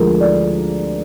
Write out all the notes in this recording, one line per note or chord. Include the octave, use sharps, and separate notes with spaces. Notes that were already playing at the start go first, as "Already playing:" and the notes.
Already playing: D2 D3 F3 G#3 G#4 A#4
D5